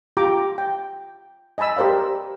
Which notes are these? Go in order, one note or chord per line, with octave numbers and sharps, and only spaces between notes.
F4 G4 G5 A#5 D6
G5
D#5 G#5 A5 B5 E6
G4 A#4 C5 D5 F5